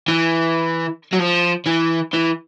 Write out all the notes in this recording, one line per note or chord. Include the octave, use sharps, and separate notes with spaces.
E3
F#3
F3
E3
E3